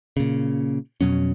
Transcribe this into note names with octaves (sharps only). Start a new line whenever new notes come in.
A#2 C#3
F2 B2 F#3 C#4